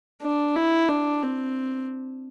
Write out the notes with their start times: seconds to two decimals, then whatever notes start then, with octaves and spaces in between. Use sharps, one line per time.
0.22 D4
0.56 E4
0.89 D4
1.23 C4